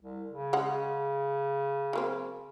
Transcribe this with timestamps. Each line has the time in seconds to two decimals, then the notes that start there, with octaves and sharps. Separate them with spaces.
0.01 C2
0.30 C#3
0.53 G#3 C#4 F#5
1.93 F#3 A#3 C4